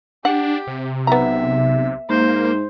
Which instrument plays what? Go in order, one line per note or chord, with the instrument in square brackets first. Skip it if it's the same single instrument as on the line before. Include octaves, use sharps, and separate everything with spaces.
[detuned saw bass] D4 [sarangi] G4 [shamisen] F#5
[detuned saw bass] C3
[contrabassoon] B1 [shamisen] B3 A#5 [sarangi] E5
[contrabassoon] G#2 [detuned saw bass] A#3 [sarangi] C5